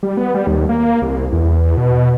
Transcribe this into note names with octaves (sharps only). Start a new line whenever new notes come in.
G3
B3
G3
D#2
A#3
C2
E2
B2